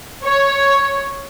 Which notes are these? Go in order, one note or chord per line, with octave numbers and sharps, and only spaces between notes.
C#5